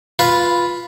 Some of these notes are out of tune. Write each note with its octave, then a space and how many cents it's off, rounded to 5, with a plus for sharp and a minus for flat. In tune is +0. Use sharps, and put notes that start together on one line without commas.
F4 +0 B4 +0 F5 +0